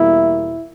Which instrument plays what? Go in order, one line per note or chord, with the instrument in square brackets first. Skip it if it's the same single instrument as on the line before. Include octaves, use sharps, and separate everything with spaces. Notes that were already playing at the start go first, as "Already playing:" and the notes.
Already playing: [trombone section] E2 B2 G3 A#3 E4